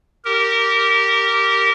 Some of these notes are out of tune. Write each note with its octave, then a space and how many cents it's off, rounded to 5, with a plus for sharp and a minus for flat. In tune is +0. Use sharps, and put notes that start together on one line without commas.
G4 -15 A#4 -15